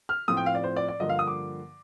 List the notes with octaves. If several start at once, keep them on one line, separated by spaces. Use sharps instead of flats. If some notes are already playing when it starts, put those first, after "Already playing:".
F6
A2 F3 C4 F4 D#6
G5
F5
D5
C5
D5
D5
G2 D3 F3 A#3 F4 D#5
F5
D#6
D6